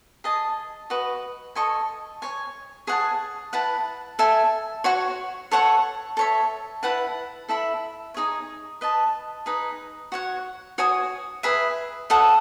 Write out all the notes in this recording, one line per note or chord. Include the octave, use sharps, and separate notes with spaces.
G#4 D#5 A5
F#4 B4 D#5
A4 D#5 G#5 C#6
C#5 G#5 C#6
G#4 C#5 F#5 A5
E4 B4 F#5 A5
A4 E5 G#5
F#4 C#5 F#5 C#6
A4 C#5 F#5 C#6
A4 C#5 E5
E4 B4 F#5 A5
E4 A4 E5 B5
D#4 G#4 C#5
B4 D#5 A5
D#4 G#4 B4
F#4 C#5 F#5
F#4 C#5 G#5 D#6
G#4 B4 E5 B5
A4 D#5 F#5